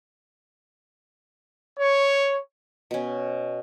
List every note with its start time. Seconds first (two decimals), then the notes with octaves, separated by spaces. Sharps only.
1.78 C#5
2.91 B2 C#4